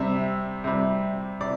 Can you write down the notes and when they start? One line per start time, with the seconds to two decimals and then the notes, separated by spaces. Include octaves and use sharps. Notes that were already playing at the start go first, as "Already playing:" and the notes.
Already playing: C3 G3 E5
0.64 C3 G3
1.40 C3 D5